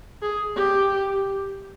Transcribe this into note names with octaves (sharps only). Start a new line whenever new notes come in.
G#4
G4